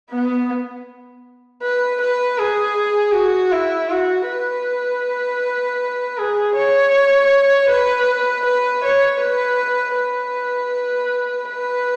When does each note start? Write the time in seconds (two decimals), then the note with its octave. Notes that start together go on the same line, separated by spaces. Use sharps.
0.11 B3
1.62 B4
2.01 B4
2.39 G#4
3.14 F#4
3.52 E4
3.90 F#4
4.28 B4
6.18 G#4
6.56 C#5
7.69 B4
8.45 B4
8.84 C#5
9.21 B4
9.97 B4
11.49 B4